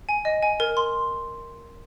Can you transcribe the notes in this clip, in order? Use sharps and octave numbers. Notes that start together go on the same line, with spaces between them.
G#5
D#5
G#5
A#4
C6